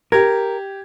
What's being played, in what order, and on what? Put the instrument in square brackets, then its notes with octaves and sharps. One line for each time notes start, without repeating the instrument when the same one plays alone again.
[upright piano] G4 G#6 [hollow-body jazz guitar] A#4